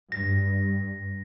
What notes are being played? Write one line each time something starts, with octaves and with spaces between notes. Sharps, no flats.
G2 A#6